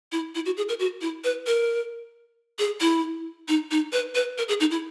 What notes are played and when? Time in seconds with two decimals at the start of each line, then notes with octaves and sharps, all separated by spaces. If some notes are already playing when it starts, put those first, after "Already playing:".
0.12 E4
0.35 E4
0.46 F#4
0.57 G#4
0.69 A#4
0.79 F#4
1.01 E4
1.24 B4
1.47 A#4
2.59 G#4
2.81 E4
3.48 D#4
3.71 D#4
3.92 B4
4.15 B4
4.38 A#4
4.49 G#4
4.60 D#4
4.71 E4